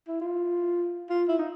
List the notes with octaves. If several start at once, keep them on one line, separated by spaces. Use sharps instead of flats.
E4
F4
F4
E4
D#4